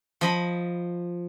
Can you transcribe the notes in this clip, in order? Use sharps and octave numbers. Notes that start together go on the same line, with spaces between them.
F3 D#5 B5